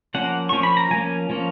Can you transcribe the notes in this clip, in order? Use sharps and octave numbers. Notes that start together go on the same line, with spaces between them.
F3 A#3 C#4 F#5
F3 A#3 C#4 C#6
B5
A#5
F3 A#3 C#4 G#5
F3 A#3 C#4